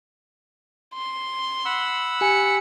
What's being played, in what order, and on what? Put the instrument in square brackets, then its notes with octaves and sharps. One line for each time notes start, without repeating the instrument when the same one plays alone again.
[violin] C6
[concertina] F#5 B5 E6
[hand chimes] G4 G#5 [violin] C#7